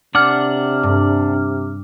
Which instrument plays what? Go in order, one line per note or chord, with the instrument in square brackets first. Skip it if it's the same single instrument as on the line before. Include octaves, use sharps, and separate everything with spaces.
[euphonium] C3 [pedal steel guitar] D4 F#5 [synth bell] D6 F6
[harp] G2